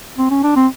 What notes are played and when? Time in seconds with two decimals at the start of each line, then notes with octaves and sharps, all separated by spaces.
0.18 C4
0.30 C#4
0.43 D4
0.56 C4